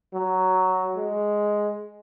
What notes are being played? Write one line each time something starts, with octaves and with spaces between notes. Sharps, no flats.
F#3
G#3